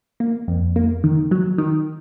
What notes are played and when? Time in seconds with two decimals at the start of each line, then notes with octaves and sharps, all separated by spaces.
0.20 A#3
0.48 F2
0.76 A#3
1.04 D#3
1.31 F#3
1.58 D#3